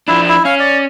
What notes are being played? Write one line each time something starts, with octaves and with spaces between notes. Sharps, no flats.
F3 D4 E4
E4
C#4 F5
D5